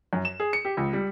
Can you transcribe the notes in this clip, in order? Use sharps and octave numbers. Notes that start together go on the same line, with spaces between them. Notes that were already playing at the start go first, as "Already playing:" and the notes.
F#2
E7
G#4
C#7
G4
C#2
G3